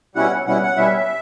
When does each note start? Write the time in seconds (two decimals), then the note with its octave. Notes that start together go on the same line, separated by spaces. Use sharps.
0.15 B2 G3 C#4 E4 F#5
0.47 B2 G3 C#4 E4 F#5
0.63 F#5
0.77 B2 G3 C#4 E4 E5